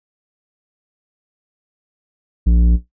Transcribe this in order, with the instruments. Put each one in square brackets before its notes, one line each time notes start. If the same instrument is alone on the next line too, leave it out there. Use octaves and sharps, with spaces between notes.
[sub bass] A#1